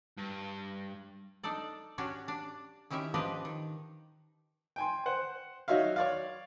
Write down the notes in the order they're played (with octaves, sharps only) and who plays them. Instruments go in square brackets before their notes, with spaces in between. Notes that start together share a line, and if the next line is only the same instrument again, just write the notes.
[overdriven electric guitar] G2
[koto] D4 D#4 A4 D5
C#4 D4 F#4 G4 C#5
D4
D#3 C#4 E4 G4 E5
F3 D4 G4 B4 D#5
D#3
[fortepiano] G5 G#5 C6
C5 F#5
F#3 D#4 F#4 C#5 E5 F5
C#5 D5 F5